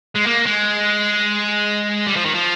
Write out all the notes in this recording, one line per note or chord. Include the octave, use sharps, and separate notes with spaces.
G#3
A#3
G#3
G3
F3
D#3
F3